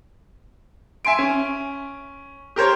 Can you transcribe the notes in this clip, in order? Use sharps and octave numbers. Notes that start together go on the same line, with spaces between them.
E5 G#5 C6 D7
C#4
G4 A#4 C5 C#5